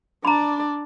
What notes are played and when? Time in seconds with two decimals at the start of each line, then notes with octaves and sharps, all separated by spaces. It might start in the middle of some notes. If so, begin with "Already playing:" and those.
0.25 D4 D5 A#5 B5